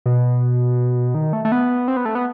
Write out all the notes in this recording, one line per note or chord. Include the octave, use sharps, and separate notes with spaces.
B2
D#3
A3
A3
B3
C4
B3
A3
B3